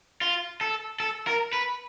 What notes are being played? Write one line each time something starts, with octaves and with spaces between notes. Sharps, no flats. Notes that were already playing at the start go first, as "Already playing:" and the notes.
F4
A4
A4
A#4
B4